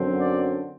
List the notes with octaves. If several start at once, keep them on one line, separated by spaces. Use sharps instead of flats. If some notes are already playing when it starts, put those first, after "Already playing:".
Already playing: F#2 D3 F#3 C4
D5